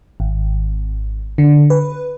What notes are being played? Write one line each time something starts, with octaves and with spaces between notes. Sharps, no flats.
G#1
D3
B4